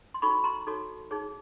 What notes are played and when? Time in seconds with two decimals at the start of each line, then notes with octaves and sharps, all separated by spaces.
0.14 C6
0.22 D#4 F#4 A4 C#5 B5 C#6
0.44 A#5 C6
0.66 D#4 F#4 A4 C#5
1.11 D#4 G#4 C#5